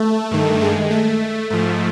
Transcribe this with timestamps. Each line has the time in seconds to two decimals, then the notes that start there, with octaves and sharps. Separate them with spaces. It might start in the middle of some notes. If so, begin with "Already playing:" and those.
Already playing: A3
0.31 G2 D#3
0.61 G#3
0.90 A3
1.50 G#2 F3 A3